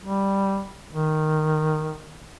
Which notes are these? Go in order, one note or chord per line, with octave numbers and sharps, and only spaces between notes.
G3
D#3